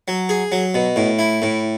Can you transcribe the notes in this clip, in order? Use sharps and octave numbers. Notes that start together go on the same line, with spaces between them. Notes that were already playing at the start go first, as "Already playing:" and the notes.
F#3
G#4
F#3
B2
A2
E4
A2